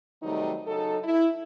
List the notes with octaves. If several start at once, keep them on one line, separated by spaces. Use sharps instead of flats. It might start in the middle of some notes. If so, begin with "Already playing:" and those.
C3 D#3 F#3 G3 A3 D#4
C#3 F#3 D#4 A4
E4